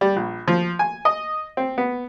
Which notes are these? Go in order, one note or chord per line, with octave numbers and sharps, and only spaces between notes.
G3
A#1
F3
G#5
D#5
C4
B3